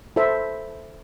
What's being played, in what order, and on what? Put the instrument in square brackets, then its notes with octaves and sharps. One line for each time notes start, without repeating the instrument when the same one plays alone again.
[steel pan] E4 A4 C5 E5